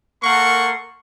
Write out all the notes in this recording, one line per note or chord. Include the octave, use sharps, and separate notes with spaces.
A#3 A4 A#4 F#5 C6 C#6